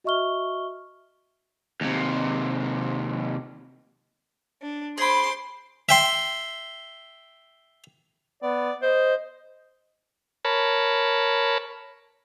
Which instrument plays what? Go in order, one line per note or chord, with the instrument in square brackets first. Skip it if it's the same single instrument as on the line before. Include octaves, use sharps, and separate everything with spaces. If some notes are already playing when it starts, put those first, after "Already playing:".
[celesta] F#4 D#5 E5 C#6 F6 G7
[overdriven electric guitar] D#2 C3
[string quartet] D4
[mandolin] G#4 B5 [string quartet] C5 C6 D6
[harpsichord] E5 G5 C6
[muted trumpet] B3 [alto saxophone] D5
[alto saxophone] C5 [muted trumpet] D#5
[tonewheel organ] A#4 C#5 A5 B5